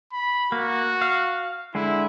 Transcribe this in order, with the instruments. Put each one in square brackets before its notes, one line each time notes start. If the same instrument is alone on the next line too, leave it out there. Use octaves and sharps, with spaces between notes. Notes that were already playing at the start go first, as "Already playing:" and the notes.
[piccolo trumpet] B5
[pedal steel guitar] A#3 [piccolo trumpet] F#4
[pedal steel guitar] F5
[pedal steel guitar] D3 G#3 [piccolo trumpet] E4